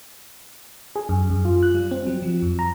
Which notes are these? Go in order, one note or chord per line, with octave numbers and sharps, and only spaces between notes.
G#4
F#2
F#2
F4
F#6
G3
C4
F#3
F3
F2
A#5